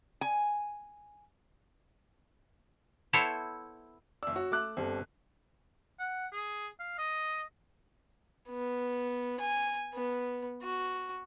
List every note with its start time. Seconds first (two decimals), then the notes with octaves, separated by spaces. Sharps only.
0.21 G#5
3.13 B3 E4 A4 C5 C#5
4.23 F#1 D5 E6
4.36 F#4 C#5
4.52 A3 E5 D6 F#6
4.77 G1 C4 G4 A4
5.99 F#5
6.32 G#4
6.79 F5
6.98 D#5
8.50 B3
9.40 G#5
9.94 B3
10.63 F#4